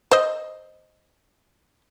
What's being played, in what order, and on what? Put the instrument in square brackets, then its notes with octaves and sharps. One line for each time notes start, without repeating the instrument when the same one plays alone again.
[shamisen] C5 D#5